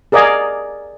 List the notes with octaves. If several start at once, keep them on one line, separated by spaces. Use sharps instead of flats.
G#4 A#4 D5 D#5 F5 G#5